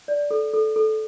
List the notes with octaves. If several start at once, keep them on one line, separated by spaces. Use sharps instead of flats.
D5
A4
A4
A4